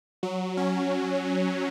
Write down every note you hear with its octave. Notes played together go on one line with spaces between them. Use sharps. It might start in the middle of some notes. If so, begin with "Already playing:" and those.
F#3
C#4